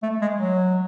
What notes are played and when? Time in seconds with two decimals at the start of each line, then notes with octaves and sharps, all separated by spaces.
0.02 A3
0.22 G#3
0.40 F#3